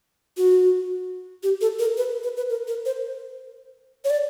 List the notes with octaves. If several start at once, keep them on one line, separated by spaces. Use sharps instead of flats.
F#4
G4
A4
A#4
B4
B4
B4
A#4
A#4
C5
C#5
D5